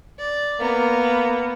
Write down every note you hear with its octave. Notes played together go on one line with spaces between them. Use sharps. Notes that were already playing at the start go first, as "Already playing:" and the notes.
D5
A#3 B3 A#5